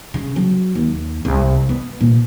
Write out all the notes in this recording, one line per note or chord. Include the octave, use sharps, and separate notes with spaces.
C#3
F#3
D#2
C2
B3
A#2